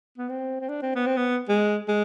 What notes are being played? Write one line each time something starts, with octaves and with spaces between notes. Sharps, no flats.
B3
C4
C4
D4
C4
B3
C4
B3
G#3
G#3